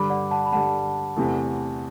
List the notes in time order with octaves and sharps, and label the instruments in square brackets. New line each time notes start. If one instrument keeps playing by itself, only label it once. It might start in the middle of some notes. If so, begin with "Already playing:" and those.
Already playing: [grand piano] G2 D3 G3 [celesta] B5 D6
[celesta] D5 F#5
F#5 A5
B5
[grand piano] G2 D3 G3 [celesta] F#5 A5
[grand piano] E2 C3 E3 A3